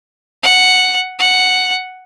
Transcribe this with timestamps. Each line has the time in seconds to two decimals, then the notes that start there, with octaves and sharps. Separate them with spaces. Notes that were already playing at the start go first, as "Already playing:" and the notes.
0.43 F#5
1.19 F#5